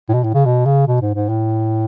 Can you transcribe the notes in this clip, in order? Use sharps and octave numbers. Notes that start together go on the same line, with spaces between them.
A2
B2
A2
C#3
B2
C#3
B2
G#2
G#2
A2